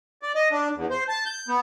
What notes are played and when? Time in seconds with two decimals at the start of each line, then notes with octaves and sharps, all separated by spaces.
0.22 D5
0.35 D#5
0.51 D4
0.75 E2
0.91 C5
1.09 A5
1.26 G6
1.48 B3